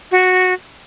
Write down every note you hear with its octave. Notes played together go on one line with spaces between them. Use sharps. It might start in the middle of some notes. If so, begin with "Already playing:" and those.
F#4